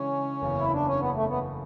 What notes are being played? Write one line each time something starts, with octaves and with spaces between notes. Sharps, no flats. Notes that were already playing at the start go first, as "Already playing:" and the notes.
Already playing: C#3 E3 G#3 C#4 D4
F#1 E2 C#3 E3
E4
D4
C#4
B3
A3
B3